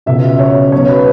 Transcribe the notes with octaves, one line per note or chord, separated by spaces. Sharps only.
C#2 B2 E5
C#5
B1 B2 C#5
B4